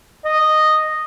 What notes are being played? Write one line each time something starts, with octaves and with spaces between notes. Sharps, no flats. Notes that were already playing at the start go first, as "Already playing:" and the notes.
D#5